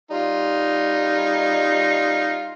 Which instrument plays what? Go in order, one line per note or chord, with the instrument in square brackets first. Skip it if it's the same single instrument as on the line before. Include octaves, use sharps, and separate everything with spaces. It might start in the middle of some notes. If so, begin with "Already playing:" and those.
[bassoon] G3 [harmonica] D#4 F4